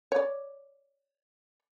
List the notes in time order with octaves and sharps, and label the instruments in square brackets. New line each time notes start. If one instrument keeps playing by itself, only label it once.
[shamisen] C#5 D5